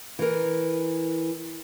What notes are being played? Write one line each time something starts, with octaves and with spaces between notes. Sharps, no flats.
E3 A#4